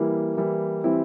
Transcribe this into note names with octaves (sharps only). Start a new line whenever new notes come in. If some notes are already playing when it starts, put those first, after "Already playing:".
Already playing: E3 G3 A#3 E4
E3 G3 A#3 E4
E3 G3 C4 E4